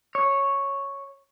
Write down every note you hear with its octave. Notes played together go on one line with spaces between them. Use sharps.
C#5